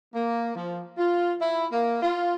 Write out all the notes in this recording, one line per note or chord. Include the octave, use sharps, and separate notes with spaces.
A#3
F3
F4
E4
A#3
F4